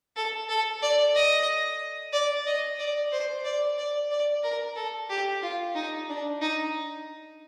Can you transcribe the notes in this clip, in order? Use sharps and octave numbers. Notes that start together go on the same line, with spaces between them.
A4
A4
D5
D#5
D5
D#5
D5
C5
D5
D5
D5
A#4
A4
G4
F4
D#4
D4
D#4